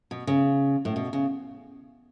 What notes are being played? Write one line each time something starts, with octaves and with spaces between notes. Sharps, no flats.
B2
C#3
A2
B2
C#3